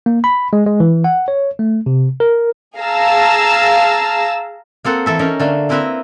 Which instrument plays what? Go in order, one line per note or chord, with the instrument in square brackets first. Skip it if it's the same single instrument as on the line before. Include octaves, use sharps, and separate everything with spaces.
[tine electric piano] A#3
B5
G#3
G#3
E3
F#5
C#5
A3
C3
A#4
[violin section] G#4 F5 A5 A#5 E6
[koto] A#3 C4 A4 F#5
E3 A4 E5
C#4 D#4 A#4 E5
D3 A3 A#3
A#3 C4 E4 B4 E5 A#5